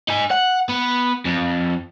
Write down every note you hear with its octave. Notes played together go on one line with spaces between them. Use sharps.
D#4 G#5
F#5
B3
F2